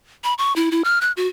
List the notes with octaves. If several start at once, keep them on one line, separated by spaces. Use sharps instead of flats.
B5
C#6
E4
E4
F6
F#6
F#4